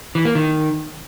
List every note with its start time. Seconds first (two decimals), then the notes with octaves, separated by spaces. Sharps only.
0.15 E3
0.25 A#3
0.35 D#3